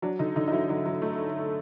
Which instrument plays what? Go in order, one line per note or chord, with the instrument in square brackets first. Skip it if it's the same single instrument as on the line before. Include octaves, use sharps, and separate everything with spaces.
[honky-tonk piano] F#3 D4
D3 D#4
D3 D#4
D#4
F#3 E4
F#3 D#4
F#3
A3